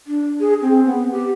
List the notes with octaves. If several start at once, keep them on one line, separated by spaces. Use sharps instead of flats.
D4
G#4
C4
B3
G4